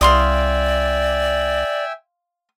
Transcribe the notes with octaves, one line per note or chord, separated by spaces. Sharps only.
C2 D5 E5 F5 G5 G#5 C6 D#6